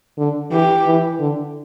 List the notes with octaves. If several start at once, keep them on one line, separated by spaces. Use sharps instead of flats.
D3
E3 G4
E3
D3